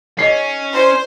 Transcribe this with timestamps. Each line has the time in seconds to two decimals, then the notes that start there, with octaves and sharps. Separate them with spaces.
0.19 C#4 D#4 G#4 D#5 C7
0.73 E4 C5 D5